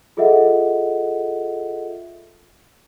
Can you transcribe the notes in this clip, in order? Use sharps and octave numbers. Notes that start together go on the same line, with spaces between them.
F4 G#4 A4 D#5 E5 F#5